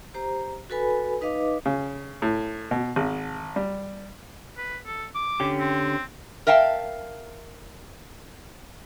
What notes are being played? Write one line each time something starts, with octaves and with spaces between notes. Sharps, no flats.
G4 C5 A#5
F#4 A4 B4 G#5 B5
D#4 B4 D#5 F5 D6
C#3
A2
B2
G#1
G3
B4
A4
D6
D3 C#4 G4
C4
A#4 E5 F5 G5 A5